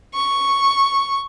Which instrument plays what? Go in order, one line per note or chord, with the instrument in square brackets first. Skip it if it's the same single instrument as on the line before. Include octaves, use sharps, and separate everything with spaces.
[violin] C#6